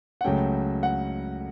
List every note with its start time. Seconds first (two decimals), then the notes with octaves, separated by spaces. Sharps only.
0.21 F#5
0.24 C#2 C#3 F#3 A3 G5
0.83 F#5